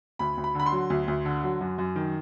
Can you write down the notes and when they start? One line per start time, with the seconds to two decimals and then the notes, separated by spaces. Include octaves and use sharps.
0.19 D2 B5
0.37 D2
0.44 B5
0.55 D3 B5
0.66 C6
0.72 F#3
0.90 D2
1.08 D2
1.25 D3
1.43 F#3
1.61 F#2
1.78 F#2
1.96 D#3